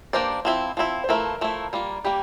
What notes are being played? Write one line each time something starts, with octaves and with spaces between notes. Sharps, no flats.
A#3 D4 G4 A#4 C5 D5
F3 C4 E4
F3 C4 E4
C5
F3 A3 E4 A#4
F3 A3 E4
G3 A#3 F4
G3 A#3 G4